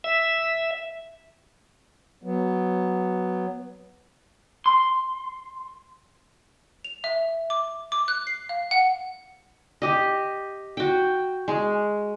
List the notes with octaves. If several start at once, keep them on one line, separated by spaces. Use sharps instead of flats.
E5
F#3 B3
C6
F7
E5
D6
D6
F#6
C7
F5
F#5
G4 D#5
F#4 G5
G#3